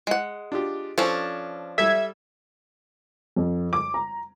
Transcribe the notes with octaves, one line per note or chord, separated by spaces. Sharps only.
G#3 F#5
D4 F4 G4
F3 C#4 D4 A4
G3 A4 E5 G#6
F2
D6
A#5